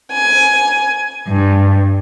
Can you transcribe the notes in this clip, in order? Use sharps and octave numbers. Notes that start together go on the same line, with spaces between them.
G#5
G2